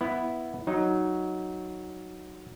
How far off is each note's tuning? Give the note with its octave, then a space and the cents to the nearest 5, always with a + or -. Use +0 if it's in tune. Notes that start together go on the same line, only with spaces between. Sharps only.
B3 +0 E4 +0
F#3 +0 D#4 +0